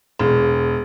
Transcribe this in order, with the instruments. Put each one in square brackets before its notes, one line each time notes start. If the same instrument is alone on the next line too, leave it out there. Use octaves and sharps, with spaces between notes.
[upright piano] E1